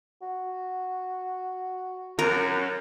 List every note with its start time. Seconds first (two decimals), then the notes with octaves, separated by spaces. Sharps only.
0.22 F#4
2.19 F#2 A#4